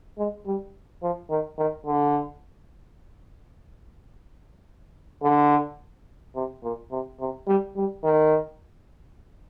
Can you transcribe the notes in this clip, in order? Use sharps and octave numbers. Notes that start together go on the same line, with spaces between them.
G#3
G3
F3
D#3
D#3
D3
D3
C3
A#2
C3
C3
G3
G3
D#3